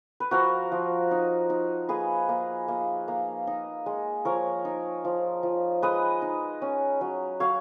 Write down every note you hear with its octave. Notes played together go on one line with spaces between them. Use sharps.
B4
F3 F#4 A#4
F3
D#4
D#4
A#3 G#4 B4
A#3
A#3
A#3
D#4
G#3
F3 A#4 C#5
D#4
F3
F3
G#3 B4 D#5
D#4
C#4
F#3
F#3 C#5 F5